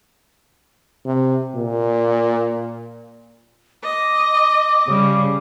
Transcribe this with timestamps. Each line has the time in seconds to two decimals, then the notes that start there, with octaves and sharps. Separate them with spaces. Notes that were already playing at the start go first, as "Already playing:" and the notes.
1.06 C3
1.55 A#2
3.84 D#5 D6
4.88 C#3 G3